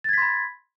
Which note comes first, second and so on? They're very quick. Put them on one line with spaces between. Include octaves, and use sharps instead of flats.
A6 G#6 B6 C6 B5